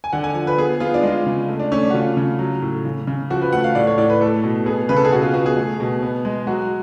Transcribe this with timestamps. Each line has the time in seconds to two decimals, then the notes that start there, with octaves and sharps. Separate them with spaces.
0.04 G#5
0.13 D3 F#5
0.24 G#5
0.35 F3
0.47 B4
0.58 B3 G#4
0.80 B3 F4
0.94 D4
1.03 G#3 F4
1.26 C#3
1.48 A3
1.59 D4
1.72 A3 C#4
1.82 D4
1.90 F#4
1.94 C#3 F4
2.17 C#3
2.39 F#3
2.62 A2
2.85 C#3
3.07 C#3
3.30 F3 F#4
3.42 B4
3.53 A3 F#5
3.64 F5
3.75 A2 D5
3.87 C#5
3.98 A2 D5
4.10 B4
4.21 A3 A4
4.43 B2
4.66 B3 G#4
4.89 C#3 B4
4.97 A4
5.05 G#4
5.12 B2 F#4
5.22 F4
5.34 B3 F#4
5.46 G#4
5.57 A3
5.80 B2
6.02 B3
6.25 G#3
6.47 F#3 F#4